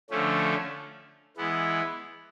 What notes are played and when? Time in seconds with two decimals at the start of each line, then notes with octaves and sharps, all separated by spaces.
0.10 D3 F3 A3 C#4
1.37 E3 G#3 B3 E4